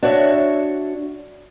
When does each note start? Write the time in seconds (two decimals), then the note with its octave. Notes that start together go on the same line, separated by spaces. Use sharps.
0.03 D4 F#4 C#5 E5